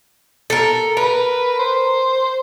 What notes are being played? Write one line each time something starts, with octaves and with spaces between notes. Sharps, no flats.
A4 A#4
A#4 B4
C5